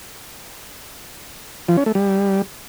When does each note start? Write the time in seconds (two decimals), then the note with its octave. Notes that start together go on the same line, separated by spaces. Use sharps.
1.69 F3
1.77 C#4
1.86 A3
1.95 G3